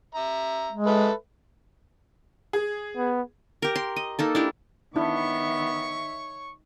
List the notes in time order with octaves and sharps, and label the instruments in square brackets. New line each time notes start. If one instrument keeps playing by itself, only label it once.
[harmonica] E5 A#5
[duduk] G#3
[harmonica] A4 B4 E5
[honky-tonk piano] G#4
[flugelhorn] B3
[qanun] G4 A#4
C6
D#5
A#3 D#4 A4
D4 E4 G4
[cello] D#3 E5 [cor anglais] B3 [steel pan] D4 E4 [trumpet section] C#5 C#6